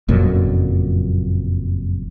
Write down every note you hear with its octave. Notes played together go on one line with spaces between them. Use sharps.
F#1 F2 A#2 F#3